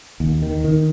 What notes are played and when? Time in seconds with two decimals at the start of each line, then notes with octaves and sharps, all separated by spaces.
0.20 D#2
0.42 D#3
0.64 D#3